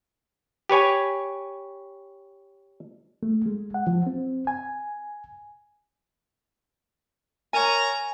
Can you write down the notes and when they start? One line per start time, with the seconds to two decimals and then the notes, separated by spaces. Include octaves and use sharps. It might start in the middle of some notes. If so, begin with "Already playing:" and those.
0.69 G4 B4 C#5 G#5
3.23 A3
3.46 G#3
3.74 F#5
3.87 F3
4.07 C4
4.47 G#5
7.53 A#4 C#5 G#5 A#5